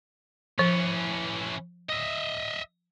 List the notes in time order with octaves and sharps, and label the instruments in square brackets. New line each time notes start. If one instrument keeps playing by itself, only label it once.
[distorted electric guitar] E3 C#4 [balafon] F3
[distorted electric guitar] D#5 E5